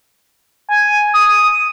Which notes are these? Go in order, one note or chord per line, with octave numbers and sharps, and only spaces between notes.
G#5
D#6